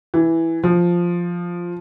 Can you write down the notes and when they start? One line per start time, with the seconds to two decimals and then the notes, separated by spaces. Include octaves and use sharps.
0.14 E3
0.64 F3